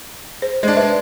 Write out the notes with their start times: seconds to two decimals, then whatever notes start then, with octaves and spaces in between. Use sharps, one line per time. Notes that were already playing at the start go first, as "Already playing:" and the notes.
0.42 G#4 C5
0.63 G#3 D4 C5
0.77 B4 C5 E5